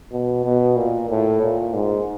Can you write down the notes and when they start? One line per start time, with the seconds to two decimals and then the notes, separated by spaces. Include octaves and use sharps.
0.12 B2
0.45 B2
0.76 A#2
1.10 A2
1.42 A#2
1.74 G#2